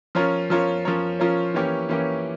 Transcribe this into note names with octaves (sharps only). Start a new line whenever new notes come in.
F3 C#4 F4 A#4 C#5
F3 C#4 F4 A#4 C#5
F3 C#4 F4 A#4 C#5
F3 C#4 F4 A#4 C#5
E3 A#3 C#4 G4 C#5
E3 A#3 C#4 G4 C#5